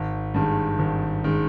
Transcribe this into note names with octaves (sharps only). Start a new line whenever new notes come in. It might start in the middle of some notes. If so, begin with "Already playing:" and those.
Already playing: G#1
G2 D#3 G#3
G#1
D#3 G#3